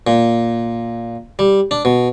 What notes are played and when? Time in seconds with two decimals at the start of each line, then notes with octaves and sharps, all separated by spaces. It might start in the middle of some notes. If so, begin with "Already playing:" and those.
0.07 A#2
1.39 G3
1.71 D4
1.85 B2